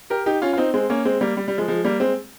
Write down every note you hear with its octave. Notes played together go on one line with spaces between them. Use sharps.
G4 A#4
D#4 G4
C#4 F4
F4
C4 D#4
G#3 C4
A#3 C#4
G#3 C4
G3 A#3
G3
G3
F3 G#3
F3 G#3
G3 A#3
G#3 C4